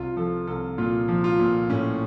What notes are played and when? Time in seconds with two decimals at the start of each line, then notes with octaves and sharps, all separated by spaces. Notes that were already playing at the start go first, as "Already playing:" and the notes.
Already playing: C2 F4
0.16 F3 A4
0.47 C2 A4
0.78 A#2 F4
1.08 F3
1.24 F4
1.39 A#2
1.70 A2 C#4